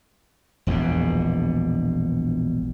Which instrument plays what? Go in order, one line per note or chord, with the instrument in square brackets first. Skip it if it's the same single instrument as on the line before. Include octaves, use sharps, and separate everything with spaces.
[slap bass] E1 A#1 E2 B2